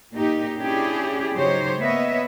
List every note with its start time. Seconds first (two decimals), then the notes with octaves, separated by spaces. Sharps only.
0.16 A#2 D#4 G4
0.58 C#4 D4 E4 G4 G#4
1.34 C#3 F#3 D#4 G4 C5 C#5
1.79 A#3 B3 B4 C#5 D#5 E5